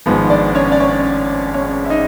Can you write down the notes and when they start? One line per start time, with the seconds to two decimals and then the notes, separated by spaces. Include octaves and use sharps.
0.06 G#1 G#2 F3 G#3 B3
0.30 D4 D5
0.55 C#4 C#5
0.72 D5
0.80 C#4 C#5
1.54 C#4 C#5
1.86 E5
1.90 D#4 D#5